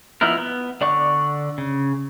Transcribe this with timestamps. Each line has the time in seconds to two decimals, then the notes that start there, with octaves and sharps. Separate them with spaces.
0.21 F3 B3 D#4 E4 A#4
0.37 B3
0.81 D3 D5 F#5 C#6
1.58 C#3